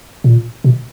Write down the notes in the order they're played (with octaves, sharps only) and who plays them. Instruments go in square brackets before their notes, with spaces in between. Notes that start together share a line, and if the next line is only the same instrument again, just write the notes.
[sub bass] A#2
B2